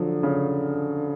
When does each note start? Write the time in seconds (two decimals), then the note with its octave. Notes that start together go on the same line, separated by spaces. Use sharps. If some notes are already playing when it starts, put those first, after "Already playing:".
Already playing: D3 F3 F#3
0.23 C#3